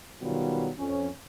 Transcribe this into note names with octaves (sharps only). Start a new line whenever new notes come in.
B2 D#3 F#3 G3 B3 F4
F2 C#4